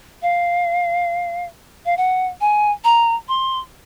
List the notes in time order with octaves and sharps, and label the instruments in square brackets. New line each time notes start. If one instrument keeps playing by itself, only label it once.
[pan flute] F5
F5
F#5
G#5
A#5
C6